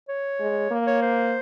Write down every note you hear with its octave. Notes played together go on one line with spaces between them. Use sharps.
C#5
G#3
A#3
C#5
C5